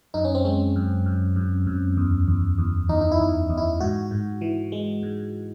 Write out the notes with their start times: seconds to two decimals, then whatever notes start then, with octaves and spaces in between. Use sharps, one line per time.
0.14 F#2 D#4
0.24 C#4
0.35 C4
0.44 G#3 C#4
0.76 F#2
1.06 F#2
1.36 F#2
1.67 F#2
1.97 E2
2.28 E2
2.58 E2
2.89 E2 D#4
3.01 D#4
3.11 E4
3.20 E2
3.50 E2
3.57 E4
3.80 G#2 F#4
4.11 G#2
4.41 E3
4.72 G#3
5.03 G#2